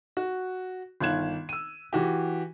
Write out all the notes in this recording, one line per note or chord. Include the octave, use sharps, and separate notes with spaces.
F#4
G1 D#3 F5 F#6 G#6 E7
E6 D#7
E3 F#4 G4